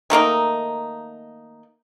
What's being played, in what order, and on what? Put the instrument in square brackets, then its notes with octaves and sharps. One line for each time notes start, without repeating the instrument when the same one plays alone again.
[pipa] D#3 A3 A#3 D#4